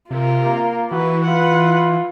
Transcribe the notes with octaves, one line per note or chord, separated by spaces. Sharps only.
C3 F4 A#4
A#3
E3 F#4 B4
F4 B4 F#5